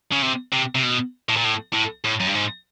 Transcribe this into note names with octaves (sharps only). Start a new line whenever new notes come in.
C#3
C3
C3
C3
B2
A2
A#2
A2
A2
A2
F#2
G2
G#2